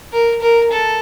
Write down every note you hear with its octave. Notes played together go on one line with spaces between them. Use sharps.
A#4
A#4
A4